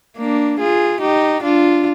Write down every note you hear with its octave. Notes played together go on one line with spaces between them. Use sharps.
A#3 D4
F4 G#4
D#4 G4
D4 F4